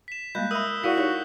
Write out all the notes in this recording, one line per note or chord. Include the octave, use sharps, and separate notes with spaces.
B6 E7
G3 G#3 A#3 F4 D#5 F#6 G6
A#4 E5 B5 D#6 E6
E4 F#4 G#4 A#4 D5 F5 F#5 B6
D#4 G4 C#5 D5